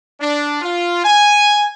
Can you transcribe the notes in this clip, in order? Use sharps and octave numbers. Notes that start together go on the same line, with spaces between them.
D4
F4
G#5